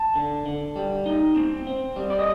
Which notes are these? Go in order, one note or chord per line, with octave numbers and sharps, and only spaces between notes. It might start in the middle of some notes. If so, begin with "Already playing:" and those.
Already playing: A5
D3
D3
G3
D#4
C4
C4
G3
D5
D#5